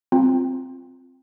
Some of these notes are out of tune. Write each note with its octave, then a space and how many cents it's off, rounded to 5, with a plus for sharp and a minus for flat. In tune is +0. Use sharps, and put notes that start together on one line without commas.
C4 +0 F4 +0 A#5 +0